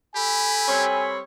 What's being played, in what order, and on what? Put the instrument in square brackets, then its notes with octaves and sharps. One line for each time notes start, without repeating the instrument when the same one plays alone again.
[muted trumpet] G4 [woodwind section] A4 B5 [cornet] G#5
[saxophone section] G3 C4 C#5